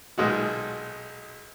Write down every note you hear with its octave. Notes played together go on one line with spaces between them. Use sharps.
B1 A#2 G#3 D#4 F#4